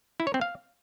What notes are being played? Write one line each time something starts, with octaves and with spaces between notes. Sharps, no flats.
E4
C#5
C4
F5